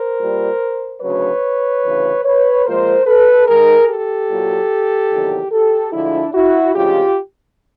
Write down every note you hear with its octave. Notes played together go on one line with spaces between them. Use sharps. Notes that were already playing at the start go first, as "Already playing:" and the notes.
Already playing: A#4 C5
A#2 G3
D2 C#3 F#3 B4 C#5
D2 C#3 E3
B4 C#5
A#2 F3 G#3 A#4 C5
A4 B4
G#2 D#3 G#3 G#4 A#4
G4 A4
A#2 F#3
E2 C3 D#3 F#3
G4 A4
D2 D3 F3 G#3 D4 E4
E4 F#4
D2 C#3 F3 G#3 F4 G4